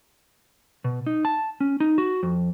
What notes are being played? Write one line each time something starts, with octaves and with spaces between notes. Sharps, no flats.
B2
D#4
A5
C#4
D#4
F#4
F2